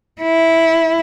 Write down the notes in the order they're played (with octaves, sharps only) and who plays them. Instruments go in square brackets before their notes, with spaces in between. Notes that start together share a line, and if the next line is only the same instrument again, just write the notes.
[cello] E4